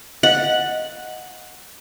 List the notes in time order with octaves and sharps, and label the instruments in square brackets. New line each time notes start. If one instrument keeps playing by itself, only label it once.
[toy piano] D#5 F5 [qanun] F#5